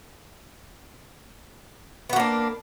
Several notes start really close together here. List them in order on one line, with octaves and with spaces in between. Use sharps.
B3 F#4 A#3 D4